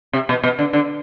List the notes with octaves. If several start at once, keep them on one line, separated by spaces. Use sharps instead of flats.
C3
B2
B2
D3
D3